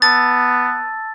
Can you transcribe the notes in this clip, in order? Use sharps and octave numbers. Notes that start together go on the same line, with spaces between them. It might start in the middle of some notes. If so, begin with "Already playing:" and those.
B3 A5 E6 A6